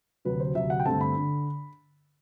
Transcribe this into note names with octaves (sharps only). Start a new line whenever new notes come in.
D2 C3 F#3 B4
C5
D2 C3 F#3 E5
F#5
G5
G2 D3 A3 C4 A5
B5
D3